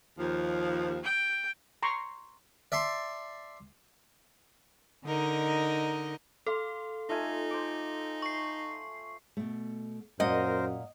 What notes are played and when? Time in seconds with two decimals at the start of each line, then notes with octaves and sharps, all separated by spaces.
0.19 D#2 F3
1.04 G5
1.83 A#5 C6 C#6
2.72 D5 E5 A5 C6
5.06 D3 D#4 A#4 D#5
6.47 A4 F5 C6
7.10 A3 D#4 F4 G#5
7.50 C5 D6
8.22 C#6 C7
9.37 B2 A3
10.20 F#2 A#2 A#3 A#4 C5 D#5 F#5